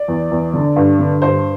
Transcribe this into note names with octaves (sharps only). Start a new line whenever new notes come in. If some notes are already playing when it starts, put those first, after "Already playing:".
Already playing: D5
E2
E2
D3
G2
D3
G2 C5